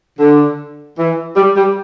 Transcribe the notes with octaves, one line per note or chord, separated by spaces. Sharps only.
D3
E3
G3
G3